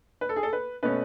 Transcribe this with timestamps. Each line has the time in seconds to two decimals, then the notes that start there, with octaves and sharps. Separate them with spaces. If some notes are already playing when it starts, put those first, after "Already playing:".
0.21 B4
0.29 A4
0.36 G#4
0.43 A4
0.53 B4
0.83 B2 A3 C#4 B4